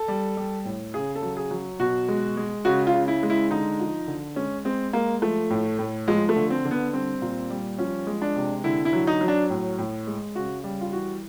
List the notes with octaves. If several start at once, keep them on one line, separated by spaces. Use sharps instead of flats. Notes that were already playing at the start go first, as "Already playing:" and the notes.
Already playing: A4
G3
G3
A2
C#3 G#4
A4
F#3
G#4
F#3
B2 F#4
G#3
G#3
C#3 F#4
F4
C#3
E4
G#3
E4
D3 D#4
F3
D3
G#3 C#4
G#3 C4
G#3 A#3
F3 A3
A2
A2
F3 G#3
A3
D3
C4
D3
B3
G3 C4
A#2
G3
F3 C#4
G#3
D4
C3
D3 E4
E4
F#3
D#4
F#3
D4
A2
A2
G#3
C#3 F#4
G3
F4
E3 F#4